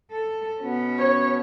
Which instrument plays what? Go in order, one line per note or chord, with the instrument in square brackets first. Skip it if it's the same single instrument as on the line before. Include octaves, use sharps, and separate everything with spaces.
[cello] A4
[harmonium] B2 [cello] C#4
[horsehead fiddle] C#5